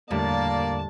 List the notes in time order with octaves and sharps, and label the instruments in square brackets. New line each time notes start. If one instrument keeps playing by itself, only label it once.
[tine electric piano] E2 D3 D4 [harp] A2 G3 [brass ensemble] A#3 D5 [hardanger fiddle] A5